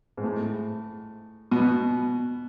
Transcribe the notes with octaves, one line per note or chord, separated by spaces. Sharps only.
G#2
A2
B2